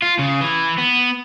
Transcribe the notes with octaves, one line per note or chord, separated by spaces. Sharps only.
F4
C#3
E3
B3